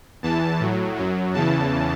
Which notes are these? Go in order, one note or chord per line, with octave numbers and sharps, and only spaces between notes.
E2 E3 A5
A2 F#3
F#2 F#3
E2 C#3 E3 A5